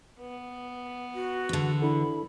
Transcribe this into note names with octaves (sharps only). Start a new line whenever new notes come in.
B3
F#4
E2 D3
D4 E4 A4 B5